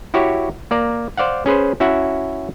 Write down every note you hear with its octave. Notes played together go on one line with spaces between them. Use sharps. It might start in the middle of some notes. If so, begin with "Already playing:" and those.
E4 F#4 G4 C#5
A#3 D5 A#5
C5 D5 F5 F#5
C#4 G#4 B4 C5
C#4 E4 F#4 E5 F#5